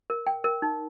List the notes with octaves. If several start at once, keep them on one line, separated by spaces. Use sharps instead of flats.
A#4
G5
A#4
D#4